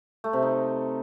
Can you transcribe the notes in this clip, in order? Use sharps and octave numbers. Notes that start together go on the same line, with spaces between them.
A3
C3
D#4